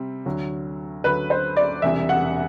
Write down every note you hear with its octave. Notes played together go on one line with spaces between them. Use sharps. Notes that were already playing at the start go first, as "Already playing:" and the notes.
Already playing: C3 G3 C4
D2 D3 F#3
D2 D3 F#3 B4
C5
D5
E1 E2 C3 G3 E5
F#5